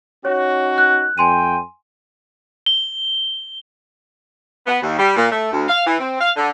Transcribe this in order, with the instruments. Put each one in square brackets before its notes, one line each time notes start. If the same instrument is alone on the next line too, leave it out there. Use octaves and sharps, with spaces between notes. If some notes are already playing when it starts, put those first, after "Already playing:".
[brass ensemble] C#4 D#4 F#4 [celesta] C#5
[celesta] F#6
[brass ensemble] F2 G5 [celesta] G#5 C6 D#7
[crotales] G7
[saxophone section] B3
D#2
G3
A#2
A3
D2
F5
E3
C4
F5
D3